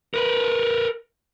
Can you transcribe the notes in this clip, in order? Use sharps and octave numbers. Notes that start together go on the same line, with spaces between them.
A#4 B4